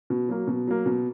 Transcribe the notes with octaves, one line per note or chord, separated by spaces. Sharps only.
B2
F#3 A#3
B2
F#3 A#3
B2